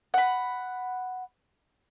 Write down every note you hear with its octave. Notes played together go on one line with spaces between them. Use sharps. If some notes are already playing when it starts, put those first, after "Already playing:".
F#5 B5